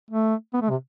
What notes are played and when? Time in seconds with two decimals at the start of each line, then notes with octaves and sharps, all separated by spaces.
0.11 A3
0.54 B3
0.62 A3
0.70 C3